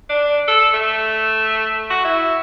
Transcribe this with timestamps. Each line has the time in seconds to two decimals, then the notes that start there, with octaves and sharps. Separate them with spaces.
0.10 D4
0.48 A4
0.74 A3
1.91 F#4
2.05 E4